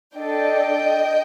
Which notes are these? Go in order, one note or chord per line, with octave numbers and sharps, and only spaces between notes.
D4 A4 D#5 G5